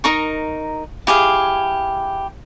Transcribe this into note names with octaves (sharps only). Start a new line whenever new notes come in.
D#4 A#4 C#6
E4 G4 G#4 F5